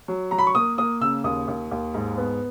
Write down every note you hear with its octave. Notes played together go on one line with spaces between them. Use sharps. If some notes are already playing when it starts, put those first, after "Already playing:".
F#3
F#3 A#5
B5
C#6
A#3 D#6
A#3 D#6
C#3 E6
D#2 D#6
D#2
D#2
G#2
B3